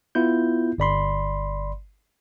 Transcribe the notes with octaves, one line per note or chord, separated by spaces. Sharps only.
B3 E4 F4 G6
G1 D5 B5 C6